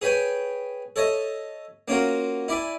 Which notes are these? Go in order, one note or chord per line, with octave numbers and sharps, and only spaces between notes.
G#4 B4 C#5 G5 G#5
A4 C#5 D#5 E5
A#3 C#4 F4 F#4 A#4
E4 D5 E5 G#5